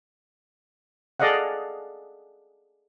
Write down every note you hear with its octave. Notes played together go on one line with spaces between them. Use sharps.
G#4 A4 D5 D#5 F5 F#5